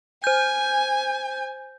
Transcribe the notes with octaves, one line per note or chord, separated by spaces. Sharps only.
C5 G#5 G6